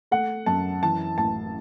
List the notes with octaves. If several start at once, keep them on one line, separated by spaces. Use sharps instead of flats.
A3 F#5
F#2 A5
E3 A5
A1 A5